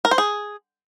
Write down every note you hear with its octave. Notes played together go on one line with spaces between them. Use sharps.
A#4
C5
G#4